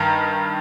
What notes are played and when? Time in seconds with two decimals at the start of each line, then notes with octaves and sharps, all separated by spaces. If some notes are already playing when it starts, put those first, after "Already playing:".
Already playing: G2 D#3 A#5